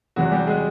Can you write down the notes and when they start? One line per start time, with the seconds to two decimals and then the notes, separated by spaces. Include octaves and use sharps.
0.16 E2 C3 E3 F#3 F#4
0.32 G3 G4
0.47 G#3 G#4